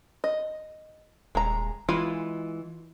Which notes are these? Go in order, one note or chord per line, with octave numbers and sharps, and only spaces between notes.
D#5
D#1 G#3 A#5
E3 G#3 F4 B5